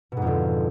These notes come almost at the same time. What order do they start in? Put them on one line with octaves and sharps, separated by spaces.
B2 G#2 F2 D3